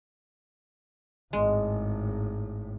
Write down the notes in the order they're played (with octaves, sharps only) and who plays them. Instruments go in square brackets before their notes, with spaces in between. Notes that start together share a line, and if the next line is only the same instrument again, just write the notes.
[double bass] G#1 A2 [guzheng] G#3